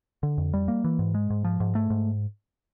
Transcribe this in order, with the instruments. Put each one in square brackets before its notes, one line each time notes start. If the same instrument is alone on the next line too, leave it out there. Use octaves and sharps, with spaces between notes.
[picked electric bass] D3
F2
G3
A#3
E3
G#2
G#3
G#2
F3
G#2
A3
G#2